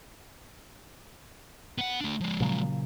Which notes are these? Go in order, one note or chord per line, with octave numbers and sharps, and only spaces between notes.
B3 F#5
A3 D4
F3 G#3
A#2 C#3 F#3